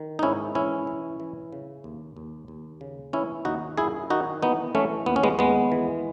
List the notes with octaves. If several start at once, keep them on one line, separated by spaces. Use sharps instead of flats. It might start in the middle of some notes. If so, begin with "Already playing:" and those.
Already playing: D#3
D#4
G#2 C#4 E4
E3 C#4 E4
E3
E3
C#3
D#2
D#2
D#2
C#3
E3 C#4 E4
D#2 D#4 F#4
F#2 E4 G#4
D#3 D#4 F#4
E3 B3 D#4
E3 A3 C#4
D#2 B3
C#4
G#3 B3
D#2 G#3 B3
E3